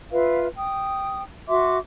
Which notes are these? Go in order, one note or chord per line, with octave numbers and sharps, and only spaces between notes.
F4 B4 E5 F5
G5 D#6
F#4 E5 C6 D6